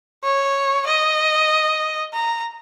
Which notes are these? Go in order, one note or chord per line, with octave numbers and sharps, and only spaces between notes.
C#5
D#5
A#5